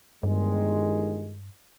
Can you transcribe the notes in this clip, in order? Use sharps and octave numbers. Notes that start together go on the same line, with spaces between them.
G1 G2 D#3 G#3